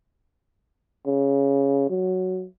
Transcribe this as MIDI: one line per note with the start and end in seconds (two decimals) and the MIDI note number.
1.07 1.89 49
1.90 2.46 54